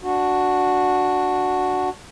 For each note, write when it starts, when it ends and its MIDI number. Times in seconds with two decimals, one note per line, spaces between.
0.02 1.89 62
0.02 1.89 66